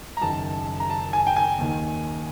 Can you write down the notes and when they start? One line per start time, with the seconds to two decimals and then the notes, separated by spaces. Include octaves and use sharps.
0.17 A#5
0.21 F#1 F#2 D#3 A5
0.80 A#5
0.90 A5
1.13 G#5
1.27 G5
1.37 G#5
1.59 D#2 D#3